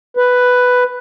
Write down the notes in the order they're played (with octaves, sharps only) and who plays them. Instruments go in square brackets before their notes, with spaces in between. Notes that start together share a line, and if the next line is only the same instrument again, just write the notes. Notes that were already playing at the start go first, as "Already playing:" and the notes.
[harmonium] B4